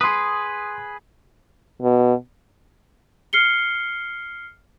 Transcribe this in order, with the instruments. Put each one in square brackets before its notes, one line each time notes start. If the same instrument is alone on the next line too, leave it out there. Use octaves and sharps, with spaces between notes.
[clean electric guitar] G#4 B4 [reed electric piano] C6 D#6
[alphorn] B2
[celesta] F6 C7 C#7 G7